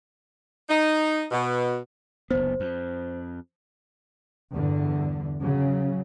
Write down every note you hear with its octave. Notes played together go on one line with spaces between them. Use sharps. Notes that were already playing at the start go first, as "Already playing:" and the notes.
D#4
B2
F#1 D2 B3 C5
F2
E2 G2 D3
C#3 F#3